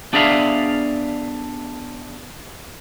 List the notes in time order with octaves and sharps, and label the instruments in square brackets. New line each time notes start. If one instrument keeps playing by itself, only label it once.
[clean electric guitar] B3 D4 G#4 D5 E5 F5